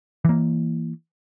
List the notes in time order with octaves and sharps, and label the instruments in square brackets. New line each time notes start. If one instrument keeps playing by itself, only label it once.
[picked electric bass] E3 A#3